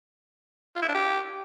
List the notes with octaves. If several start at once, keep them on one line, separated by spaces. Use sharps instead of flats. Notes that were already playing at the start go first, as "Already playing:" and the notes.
F4
E4
D4
G4